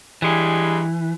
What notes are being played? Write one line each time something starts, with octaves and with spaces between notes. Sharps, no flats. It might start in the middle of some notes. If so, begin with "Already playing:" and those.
G2 E3 G3 G#3